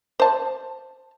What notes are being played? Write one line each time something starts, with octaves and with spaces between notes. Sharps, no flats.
C5 A5